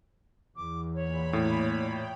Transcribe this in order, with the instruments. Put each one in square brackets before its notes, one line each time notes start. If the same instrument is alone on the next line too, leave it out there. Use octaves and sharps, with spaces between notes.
[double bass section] E2 [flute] D6
[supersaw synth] A#2 B5 [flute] C#5
[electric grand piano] A2
[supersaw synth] G5